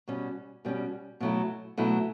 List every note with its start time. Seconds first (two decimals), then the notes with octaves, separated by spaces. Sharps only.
0.08 B2 G3 C#4
0.65 B2 G3 C#4
1.20 B2 F#3 A3 E4
1.78 B2 F#3 A3 E4